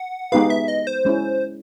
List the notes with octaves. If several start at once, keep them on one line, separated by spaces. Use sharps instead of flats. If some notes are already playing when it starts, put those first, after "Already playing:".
Already playing: F#5
G#3 B3 D#4 G4 B4 F5
E5
D#5
C5
G#3 C#4 E4